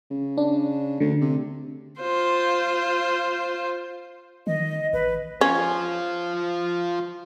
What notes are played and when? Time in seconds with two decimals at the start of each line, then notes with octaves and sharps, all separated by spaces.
0.11 C#3
0.37 D4
1.00 D2 D3
1.21 C3
2.01 F4 C5
4.47 D#3 D#5
4.93 A1 B4
5.41 C#4 F4 C5